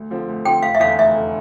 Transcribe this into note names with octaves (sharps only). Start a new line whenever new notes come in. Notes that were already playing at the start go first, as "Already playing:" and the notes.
Already playing: D2
D3 F3 C4
D2
D3 F3 C4 G5
F1 F5
E5
E2 D3 F5
F1 E5
D3